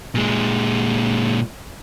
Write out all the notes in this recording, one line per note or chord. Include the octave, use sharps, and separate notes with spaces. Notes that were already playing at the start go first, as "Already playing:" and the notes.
A#2 G#3